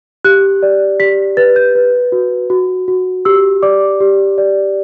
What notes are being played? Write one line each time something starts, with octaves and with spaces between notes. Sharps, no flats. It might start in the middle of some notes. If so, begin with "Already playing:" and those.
G4 F#6
D5
G4 B6
B4 A6
G6
B4
F#4
F#4
F#4
G4 E6
D5 D6
G4
D5